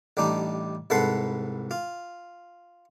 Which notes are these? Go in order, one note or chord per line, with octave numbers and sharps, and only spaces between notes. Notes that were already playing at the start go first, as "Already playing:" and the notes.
A1 G3 D4 D#4
C2 G#2 A4 B4 F#5 C6
F4